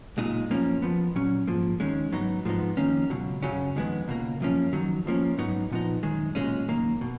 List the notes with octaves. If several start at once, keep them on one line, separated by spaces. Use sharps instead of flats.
B1 A#2 G#3 D#4
F#2 F3 A#3 C#4
F2 F3 B3
A#2 F#3 C#4
G#2 F3 A#3
D#2 D#3 G#3 C#4
G#2 F#3 B3 D#4
G#2 F3 G#3 B3 D#4
F2 D#3 A#3 C#4
C#2 B2 F#3
F#2 C#3 F#3 C#4
F2 D#3 G#3 B3
C#2 B2 A#3
F#2 F3 A#3 C#4
F2 D#3 F#3
F2 F3 A#3 C#4
G#2 F#3 B3 D#4
A#2 F3 B3 D#4
F#2 D#3 G#3
B1 A#2 G#3 C#4
F#2 D#3 A#3
B2